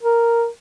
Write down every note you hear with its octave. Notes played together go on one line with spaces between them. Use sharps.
A#4